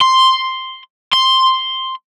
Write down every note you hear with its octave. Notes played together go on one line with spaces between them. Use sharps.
C6
C6